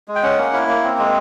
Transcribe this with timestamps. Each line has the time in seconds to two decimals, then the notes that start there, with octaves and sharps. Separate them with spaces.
0.08 G#3
0.15 G5
0.23 C#4 F#5
0.38 A#3
0.53 E4
0.68 A#3
0.83 C4
0.98 G#3